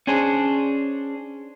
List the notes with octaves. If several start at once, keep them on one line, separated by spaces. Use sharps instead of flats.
C#4 D4 G#4 C5